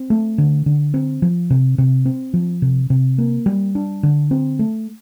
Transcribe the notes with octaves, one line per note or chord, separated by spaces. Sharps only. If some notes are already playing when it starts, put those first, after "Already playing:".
Already playing: C4
A3
D3
D3
C4
F3
C3
C3
C4
F3
C3
C3
A#3
G3
D4
D3
C4
A3